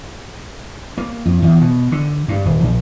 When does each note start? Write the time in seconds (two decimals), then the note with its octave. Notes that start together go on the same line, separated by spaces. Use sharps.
0.98 A#3
1.26 F2
1.42 E2
1.61 B2
1.92 D3
2.28 G2
2.45 D#1
2.64 A#1